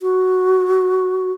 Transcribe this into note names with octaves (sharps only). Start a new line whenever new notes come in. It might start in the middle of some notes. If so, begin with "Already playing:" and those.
F#4